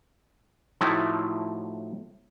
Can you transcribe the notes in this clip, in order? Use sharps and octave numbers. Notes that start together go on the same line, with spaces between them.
A2 F3 F#3 A3 D#4 E4